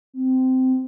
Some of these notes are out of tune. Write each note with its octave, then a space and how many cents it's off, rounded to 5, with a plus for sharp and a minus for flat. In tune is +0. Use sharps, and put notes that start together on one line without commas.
C4 -15